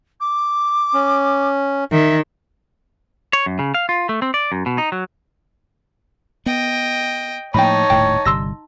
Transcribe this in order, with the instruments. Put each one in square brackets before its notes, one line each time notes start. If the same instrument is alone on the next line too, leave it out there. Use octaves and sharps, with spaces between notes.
[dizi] D6
[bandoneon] C#4
[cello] D#3 [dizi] E5
[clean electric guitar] C#5
F#2
C#3
F5
F4
A3
C4
D5
F#2
B2
D#4
F#3
[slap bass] B3 [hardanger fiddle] D#5 G5
[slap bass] A2 F3 A#3 [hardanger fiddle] D#4 A5 [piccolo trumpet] C#5 [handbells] G5 B5
[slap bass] D#1 A2 [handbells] G5
[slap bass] G1 C3 G3 [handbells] C6 E6 A#6